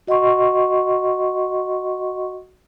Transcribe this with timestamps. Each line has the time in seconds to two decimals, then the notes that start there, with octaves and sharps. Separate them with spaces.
0.07 F#4 D#5 F#5 C6 C#6